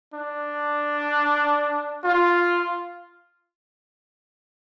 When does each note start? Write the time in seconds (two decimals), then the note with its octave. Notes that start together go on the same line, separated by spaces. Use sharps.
0.14 D4
2.04 F4